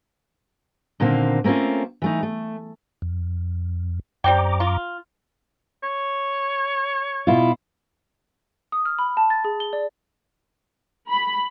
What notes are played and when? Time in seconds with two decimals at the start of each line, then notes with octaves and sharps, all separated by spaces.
1.00 A#2 D3 D#3 A#3 C4
1.44 A3 A#3 C4 C#4 F4
2.02 E3 A3 D#4
2.23 A3
3.02 F2
4.24 F#2 G3 C4 G5 A#5 D6
4.60 F4
5.83 C#5
7.27 B2 E4 F4
8.72 D#6
8.85 F6
8.99 B5
9.17 A5
9.30 A6
9.44 G#4
9.60 G7
9.73 D5
11.09 B5